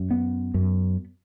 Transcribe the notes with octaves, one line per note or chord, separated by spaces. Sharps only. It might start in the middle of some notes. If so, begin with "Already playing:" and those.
Already playing: F#2
B3
F#2